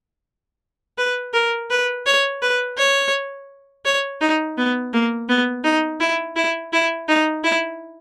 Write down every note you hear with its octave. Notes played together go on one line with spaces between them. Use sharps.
B4
A#4
B4
C#5
B4
C#5
C#5
D#4
B3
A#3
B3
D#4
E4
E4
E4
D#4
E4